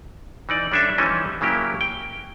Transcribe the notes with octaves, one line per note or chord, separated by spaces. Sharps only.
E3 D#4 D5
G3 C#4 D4 A4 E5
E3 F3 G3 C#4 D#4
C#3 F#3 A#3 E4 G4
G5